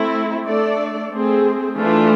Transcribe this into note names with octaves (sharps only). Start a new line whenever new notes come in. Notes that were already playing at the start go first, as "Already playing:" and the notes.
Already playing: A3 C4 E4
A3 D4 A4 D5
A3 C4 G#4
E3 A3 D4 F4